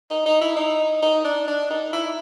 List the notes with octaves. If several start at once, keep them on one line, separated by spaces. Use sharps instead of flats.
D#4
D#4
E4
D#4
D#4
D4
D4
D#4
E4